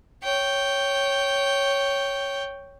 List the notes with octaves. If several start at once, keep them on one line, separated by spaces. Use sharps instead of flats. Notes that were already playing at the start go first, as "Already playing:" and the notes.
C#5 G5